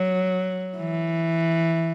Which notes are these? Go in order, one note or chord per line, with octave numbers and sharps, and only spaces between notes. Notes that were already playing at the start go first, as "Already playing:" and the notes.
Already playing: F#3
E3